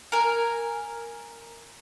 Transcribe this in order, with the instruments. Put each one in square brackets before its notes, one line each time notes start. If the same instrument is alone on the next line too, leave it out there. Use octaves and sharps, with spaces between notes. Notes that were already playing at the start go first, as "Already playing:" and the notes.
[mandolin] A#4 G#5